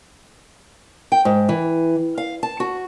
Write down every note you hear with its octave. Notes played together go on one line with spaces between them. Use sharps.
G5
G#2
E3
F5
A5
F#4